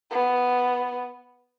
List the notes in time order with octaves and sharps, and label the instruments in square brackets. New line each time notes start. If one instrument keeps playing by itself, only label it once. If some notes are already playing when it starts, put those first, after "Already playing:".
[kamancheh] B3